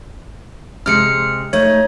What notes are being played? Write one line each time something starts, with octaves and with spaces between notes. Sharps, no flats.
C3 G#3 F6 C#7
A3 D#4 C#5